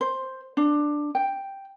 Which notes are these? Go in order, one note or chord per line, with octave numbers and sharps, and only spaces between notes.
C5
D4
G5